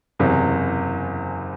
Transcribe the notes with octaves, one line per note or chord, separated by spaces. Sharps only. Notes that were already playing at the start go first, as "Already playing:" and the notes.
F#1 E2 C3